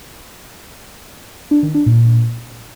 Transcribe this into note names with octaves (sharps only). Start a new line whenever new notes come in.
D4
D#3
D4
A#2